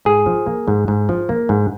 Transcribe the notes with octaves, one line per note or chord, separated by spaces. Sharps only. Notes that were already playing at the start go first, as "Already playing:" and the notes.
G#2 G#4
F3
A#3
G#2
G#2
F3
A#3
G#2